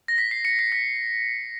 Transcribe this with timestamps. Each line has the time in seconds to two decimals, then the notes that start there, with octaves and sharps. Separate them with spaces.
0.08 A#6
0.18 B6
0.31 C7
0.45 C#7
0.59 C7
0.72 B6